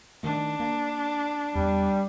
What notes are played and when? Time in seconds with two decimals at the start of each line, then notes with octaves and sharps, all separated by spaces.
0.23 D#3 A3 D4
0.60 A#3
1.55 E2 G3